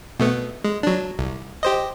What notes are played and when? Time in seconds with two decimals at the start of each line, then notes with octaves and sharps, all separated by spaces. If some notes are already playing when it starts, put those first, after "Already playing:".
0.20 B2 A3 B3
0.64 G#3
0.83 F#3 D4
1.19 C2
1.63 G4 C5 D#5